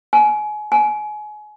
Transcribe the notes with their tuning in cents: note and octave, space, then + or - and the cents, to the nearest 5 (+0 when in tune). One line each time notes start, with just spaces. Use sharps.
G#5 +30
G#5 +30